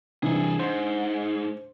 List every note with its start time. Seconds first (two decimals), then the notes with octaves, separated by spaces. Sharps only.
0.23 C3 E3 G3 D4 G#4 A4
0.60 G#2 C5